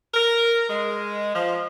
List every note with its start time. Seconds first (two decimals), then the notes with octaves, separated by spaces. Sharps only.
0.14 A#4
0.69 G#3
1.35 F3